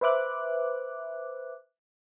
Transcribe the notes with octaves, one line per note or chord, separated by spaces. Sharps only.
B4 C5 E5 D6 F#6